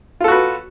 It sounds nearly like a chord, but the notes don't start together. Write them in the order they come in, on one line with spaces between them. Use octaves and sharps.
F4 A4 F#4 B4